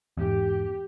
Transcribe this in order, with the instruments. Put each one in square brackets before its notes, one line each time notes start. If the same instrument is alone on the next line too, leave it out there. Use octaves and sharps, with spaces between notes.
[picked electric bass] E2 G#2 [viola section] G4